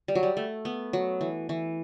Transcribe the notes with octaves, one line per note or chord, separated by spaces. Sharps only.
G3
F#3
G3
A3
B3
F#3
E3
E3